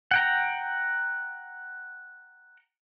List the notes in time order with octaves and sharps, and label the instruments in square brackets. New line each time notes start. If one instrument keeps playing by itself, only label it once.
[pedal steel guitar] F#5 G5 A#5